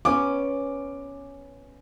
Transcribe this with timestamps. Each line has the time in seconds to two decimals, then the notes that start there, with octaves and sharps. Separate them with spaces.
0.05 B3 C#4 D6